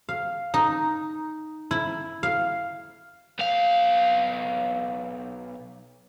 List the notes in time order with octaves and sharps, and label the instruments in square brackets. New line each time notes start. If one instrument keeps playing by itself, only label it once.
[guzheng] F5
D#4
E4
F5
[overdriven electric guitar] B1 F5